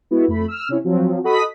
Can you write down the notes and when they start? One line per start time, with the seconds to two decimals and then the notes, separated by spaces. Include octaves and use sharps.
0.11 G#3 B3 E4 F#4
0.28 F2 A3 B5
0.48 E6 F6
0.69 C3 C#4 E4
0.84 F3 F#3 C4
1.24 F#4 A4 D#5 B5 D#6 B6